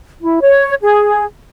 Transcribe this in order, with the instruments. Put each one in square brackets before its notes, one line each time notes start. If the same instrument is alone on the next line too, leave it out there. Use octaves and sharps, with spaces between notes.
[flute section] E4
C#5
G#4